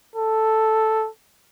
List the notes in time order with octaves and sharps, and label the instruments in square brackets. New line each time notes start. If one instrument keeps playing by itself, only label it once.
[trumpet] A4